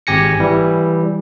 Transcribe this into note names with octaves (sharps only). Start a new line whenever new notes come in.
G#1 G4 G#5 A#6 C#7
E3 G3